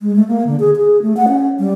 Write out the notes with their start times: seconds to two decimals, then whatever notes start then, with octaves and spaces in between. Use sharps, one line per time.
0.01 G#3
0.16 A3
0.28 A#3
0.47 D3
0.60 G#4
0.77 G#4
1.02 A3
1.17 F#5
1.28 C#4
1.59 G3